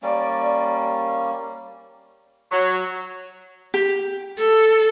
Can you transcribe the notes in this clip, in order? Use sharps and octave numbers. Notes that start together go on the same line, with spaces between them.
G3 A#3 C#4 D5
F#3
G4
A4